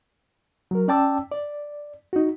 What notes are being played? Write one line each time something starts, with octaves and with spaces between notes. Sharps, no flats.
F#3 A#4
C#4 D5 G5 A5 D6 E6
D5
D#4 F#4